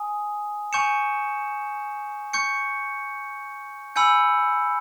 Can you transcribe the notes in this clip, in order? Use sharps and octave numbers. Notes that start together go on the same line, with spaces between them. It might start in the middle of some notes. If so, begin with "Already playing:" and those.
Already playing: G#5 D#6
G#5 C#6 G6 C#7 E7
C#6 G6 C#7
G#5 B5 E6 G6 C#7